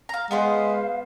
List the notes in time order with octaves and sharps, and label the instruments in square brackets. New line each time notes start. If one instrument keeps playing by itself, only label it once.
[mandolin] F5 A#5
[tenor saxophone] G#3 [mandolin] B3 B4 C5 [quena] F5